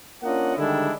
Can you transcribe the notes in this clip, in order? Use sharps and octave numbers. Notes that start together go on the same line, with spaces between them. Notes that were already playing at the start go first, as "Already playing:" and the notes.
A#3 C#4 D4 F4 D#5 F#5
D3 D#3 G3 G#3 D4 E4